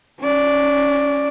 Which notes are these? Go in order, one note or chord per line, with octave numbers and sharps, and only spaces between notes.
C#4 D5